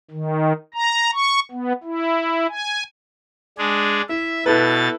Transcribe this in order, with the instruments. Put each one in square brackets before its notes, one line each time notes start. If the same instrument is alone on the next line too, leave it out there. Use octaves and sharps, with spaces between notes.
[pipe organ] D#3
A#5
C#6
B3
E4
G#5
G#3 D4 G#4
[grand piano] E4 [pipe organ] E5
[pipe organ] B2 A6 [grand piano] E4 A4 B4